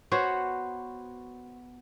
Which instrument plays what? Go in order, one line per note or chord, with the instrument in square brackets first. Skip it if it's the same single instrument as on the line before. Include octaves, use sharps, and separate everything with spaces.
[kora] B3 F#4 C5 C#5